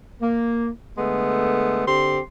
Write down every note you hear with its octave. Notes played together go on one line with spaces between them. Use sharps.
A#3
D3 G#3 A3 B3
D3 C4 G4 C6